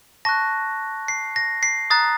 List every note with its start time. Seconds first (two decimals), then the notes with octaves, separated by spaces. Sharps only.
0.25 A5 C#6 F#6 A#6
1.08 C7
1.36 A#6
1.63 C7
1.90 A#5 D#6 F#6 A6